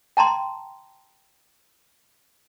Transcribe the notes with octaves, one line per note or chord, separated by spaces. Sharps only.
G5 A5 A#5 C6